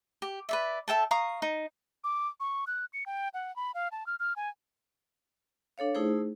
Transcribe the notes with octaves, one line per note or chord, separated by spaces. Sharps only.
G4
B4 D5 E5
A4 E5 G5 A5
F5 A#5 C#6 D#6
D#4
D6
C#6
F#6
C#7
G5
F#5
B5
F5
A5
F6
F6
G#5
D4 A4 C#5 F5
A3 D#4 E4 G#4 C5